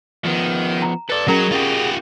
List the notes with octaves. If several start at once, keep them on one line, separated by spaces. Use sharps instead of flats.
D#3 F3 B3
A#5
A4 B4 D5
F#3 C#4 F#4 G#4 A#4 D#5 A#5
F4 G4